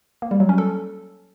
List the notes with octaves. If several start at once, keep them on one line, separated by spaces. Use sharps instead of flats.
A#3
G3
F#3
C#4
A4